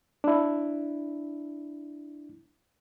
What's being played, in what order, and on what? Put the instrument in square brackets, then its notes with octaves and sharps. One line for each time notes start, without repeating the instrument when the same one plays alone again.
[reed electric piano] D4 E4